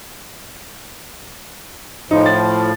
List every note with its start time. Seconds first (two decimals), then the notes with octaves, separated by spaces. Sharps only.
2.11 A2 F3 D#4
2.26 A6